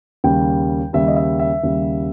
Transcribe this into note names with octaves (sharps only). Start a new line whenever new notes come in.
D#2 C#3 G3 G5
D#2 C#3 G3 E5
D#5
E5
E5
D#2 C#3 G3